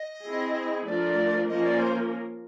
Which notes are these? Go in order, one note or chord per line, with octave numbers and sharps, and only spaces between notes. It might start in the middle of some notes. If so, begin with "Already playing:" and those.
Already playing: D#5
C4 E4 G#4
F3 A3 D4 F4 A#4 D5
F3 A#3 C#4 F4 A#4 D#5
D5
C5